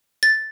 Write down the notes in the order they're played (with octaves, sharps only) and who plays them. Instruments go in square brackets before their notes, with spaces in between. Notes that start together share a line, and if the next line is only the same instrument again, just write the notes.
[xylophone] A6